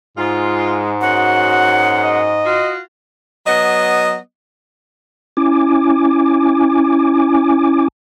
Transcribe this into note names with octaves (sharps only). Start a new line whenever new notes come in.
G#2 G#3 F4
F#2 G#3 C#4 F#4 F#5
D#5
F4 F#4
F#3 B3 D#5
C#4 E4 G#5 D6